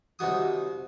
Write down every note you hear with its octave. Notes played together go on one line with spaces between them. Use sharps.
C2 D#3 F#4 D#6